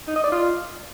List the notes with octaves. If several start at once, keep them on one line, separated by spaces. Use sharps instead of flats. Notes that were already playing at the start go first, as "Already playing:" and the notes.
D#4
D#5
D5
F4